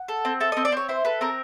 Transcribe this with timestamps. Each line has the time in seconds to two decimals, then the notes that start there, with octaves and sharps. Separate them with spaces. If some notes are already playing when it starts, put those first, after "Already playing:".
Already playing: F#5
0.08 A4
0.25 C4
0.40 A4 E5
0.52 C4 D#5
0.65 D5
0.72 C4 C#5
0.89 E4 C5
1.05 A4 B4
1.21 C4 A#4